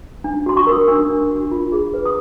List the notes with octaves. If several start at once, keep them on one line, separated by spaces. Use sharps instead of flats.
D4
F#4 C6
C#6
A#4
D#6
D4 E6
D4
F#4
F4
G#4
B4
D#6